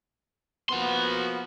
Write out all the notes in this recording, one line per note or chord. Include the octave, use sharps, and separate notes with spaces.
F3 A#3 B3 F#4 C6